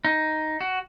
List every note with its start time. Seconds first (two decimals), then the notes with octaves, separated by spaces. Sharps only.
0.05 D#4
0.61 F#4